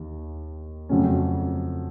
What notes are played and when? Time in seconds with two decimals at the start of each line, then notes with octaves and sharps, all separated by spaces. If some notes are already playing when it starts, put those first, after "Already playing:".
Already playing: D#2 D#3
0.89 F2 C#3 F#3 A3 C#4